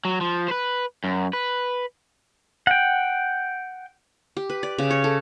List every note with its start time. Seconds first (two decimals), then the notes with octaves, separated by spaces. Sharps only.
0.05 F#3
0.21 F3
0.48 B4 C5
1.04 F#2
1.33 B4
2.67 F#5 G5
4.37 G4
4.50 B4
4.63 D5
4.78 C#3
4.90 C#5
5.04 A4